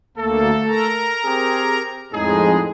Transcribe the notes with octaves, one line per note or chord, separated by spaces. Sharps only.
D2 A3 A#3 A4
A#4 A#5
C4 G4 G#4
F2 A2 G#3 D#4 G#4